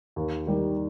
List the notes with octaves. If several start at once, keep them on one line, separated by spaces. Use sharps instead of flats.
D#2
D#3 G3